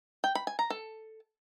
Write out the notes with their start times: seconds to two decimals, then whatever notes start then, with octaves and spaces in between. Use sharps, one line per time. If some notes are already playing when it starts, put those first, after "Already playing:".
0.24 G5
0.35 B5
0.47 G#5
0.59 A#5
0.70 A4